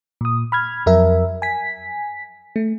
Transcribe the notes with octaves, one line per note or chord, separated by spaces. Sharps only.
A#2 D#6
B5 F6 G#6
F2 F#3 A#4 E5
G#5 B6
A3